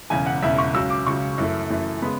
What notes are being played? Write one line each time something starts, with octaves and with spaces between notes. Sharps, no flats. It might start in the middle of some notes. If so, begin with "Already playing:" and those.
E1 E2 C#3 G#5
F#5
E1 E2 C#3 E5
C#6
C#2 C#3 F#3 E6
D6
C#2 C#3 F#3 C#6
F#2 E3 A3
F#2 E3 A3
C#3 G#3 B3 B5